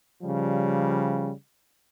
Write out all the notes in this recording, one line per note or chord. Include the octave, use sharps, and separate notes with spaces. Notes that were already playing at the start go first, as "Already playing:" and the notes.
C#3 F3 G3